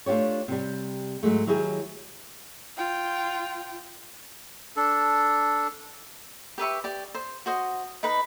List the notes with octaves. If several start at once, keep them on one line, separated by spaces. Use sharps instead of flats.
A3 D4 F4 G4 C#5
C3 G3
G#2 F#3 G#3 A3
D#3 F#3 E4 G4 G#4
F4 G5
D4 A4
G4 B4 E5 C#6
G4 D5
C5
F#4 C5 D#5
D#4 B4 B5